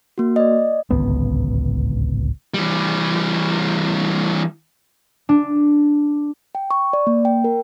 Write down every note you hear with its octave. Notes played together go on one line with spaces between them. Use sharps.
A#3 F#4
D5 D#5
D1 G#1 C#2 B3
E3 G3
D4
G5
C#6
D5
A#3
G5
A#4